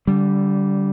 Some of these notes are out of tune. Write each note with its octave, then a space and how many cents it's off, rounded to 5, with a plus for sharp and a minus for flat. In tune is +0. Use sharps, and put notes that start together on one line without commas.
D3 -25 G3 -10